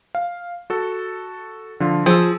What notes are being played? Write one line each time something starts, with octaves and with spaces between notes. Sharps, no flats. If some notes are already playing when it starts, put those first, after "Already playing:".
F5
F#4 A4
D3 F3 F4
F3 G#4 E6